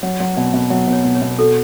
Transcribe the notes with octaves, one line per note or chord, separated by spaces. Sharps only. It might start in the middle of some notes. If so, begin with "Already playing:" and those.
F#3 C#5
F#3
B2 D5
B2
F#3 E5
B2
C#5
B2
C#5
B2
F#4 A4